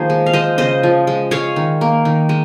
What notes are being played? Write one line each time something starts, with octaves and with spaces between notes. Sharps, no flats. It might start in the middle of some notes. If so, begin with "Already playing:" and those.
Already playing: D#3 F3 A#3 G#4 C5
G#3
F5
G#3 C5 D#5
C#3 C5 D#5
F3
G#3
G#3 C#5 F5
D#3
A#3
D#3
G#3